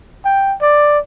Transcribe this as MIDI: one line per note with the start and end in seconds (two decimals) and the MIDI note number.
0.25 0.55 79
0.61 0.99 74